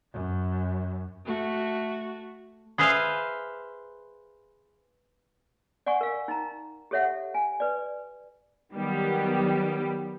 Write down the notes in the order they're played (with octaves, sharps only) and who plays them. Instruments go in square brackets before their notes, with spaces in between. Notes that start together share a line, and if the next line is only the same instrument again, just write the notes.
[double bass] F#2
[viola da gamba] A3 F#4
[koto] G#4 B4 C5 E5 F5
[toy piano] D5 F#5 G#5 C#6
A#4 F5
D#4 A#5
G4 A4 C#5 E5 F#5
G#5
B4 D5
[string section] D#3 F#3 G3 B3 G4